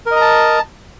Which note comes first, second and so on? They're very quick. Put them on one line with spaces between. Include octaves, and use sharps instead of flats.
A#4 D#5 A#5 A5